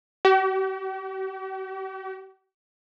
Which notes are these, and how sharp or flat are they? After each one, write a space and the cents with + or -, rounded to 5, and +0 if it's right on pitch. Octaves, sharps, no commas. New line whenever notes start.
G4 -45